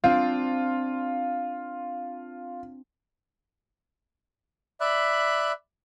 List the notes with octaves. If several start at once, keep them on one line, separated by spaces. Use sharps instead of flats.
C4 D4 F4
D5 E5 B5 F#6